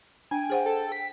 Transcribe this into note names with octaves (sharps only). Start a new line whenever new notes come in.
D4 G5 G#5
G#4 C5 F#5
A4
B6